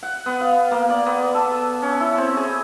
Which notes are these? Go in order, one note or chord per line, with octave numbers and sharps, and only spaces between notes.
F#5
B3
F5
A#3
D5
B3
A4
C#4
E4
C4
G#4